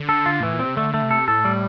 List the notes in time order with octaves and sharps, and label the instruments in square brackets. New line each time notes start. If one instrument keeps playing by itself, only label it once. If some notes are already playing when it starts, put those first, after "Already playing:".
Already playing: [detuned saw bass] D3
[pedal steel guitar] A4
F4
[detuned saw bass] A2 [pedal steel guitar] E3
[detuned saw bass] A#2
[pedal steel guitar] C4
[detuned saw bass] C3
[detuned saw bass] D3 [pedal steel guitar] A3
[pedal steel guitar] A3
[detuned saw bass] C3
[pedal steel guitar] A4
[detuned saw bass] A2 [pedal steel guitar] A4
[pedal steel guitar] G3